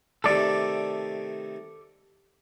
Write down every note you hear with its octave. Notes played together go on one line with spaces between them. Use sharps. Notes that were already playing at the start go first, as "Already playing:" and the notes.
C3 D#3 A3 A4 D5